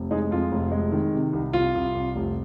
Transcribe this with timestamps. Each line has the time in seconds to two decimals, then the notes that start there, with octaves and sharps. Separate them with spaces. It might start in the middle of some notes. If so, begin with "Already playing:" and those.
Already playing: F1
0.11 G#3 D#4 G#4
0.31 F2 F4
0.52 F1
0.72 G#3
0.92 D#3
1.14 C3
1.33 C2
1.53 C2 F4
1.75 C2
1.95 C2
2.16 F1